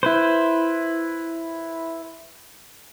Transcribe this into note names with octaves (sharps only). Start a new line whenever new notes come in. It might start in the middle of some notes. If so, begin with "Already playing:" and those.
E4 B4 C5